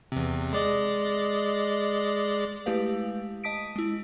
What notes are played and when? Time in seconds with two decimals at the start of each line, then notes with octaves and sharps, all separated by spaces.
0.12 E2 C3
0.53 G#3 D5 D#5
2.66 G#3 A3 E4 G4 B4 F5
3.44 D#5 A5 D#6 B6 D7
3.76 G#3 E4